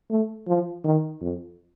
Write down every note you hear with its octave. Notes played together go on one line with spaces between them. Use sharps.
A3
F3
D#3
F2